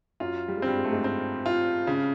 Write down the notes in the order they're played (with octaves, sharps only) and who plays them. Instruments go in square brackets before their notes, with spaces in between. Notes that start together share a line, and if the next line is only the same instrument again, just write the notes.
[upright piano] F#2 F#3 [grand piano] F4
[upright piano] G3
G#3
[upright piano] G2 G3 [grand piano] C4
[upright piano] G#3
A3
G#2 G#3
[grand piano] C4
F4
C#3